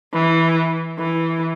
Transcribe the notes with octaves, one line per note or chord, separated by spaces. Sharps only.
E3
E3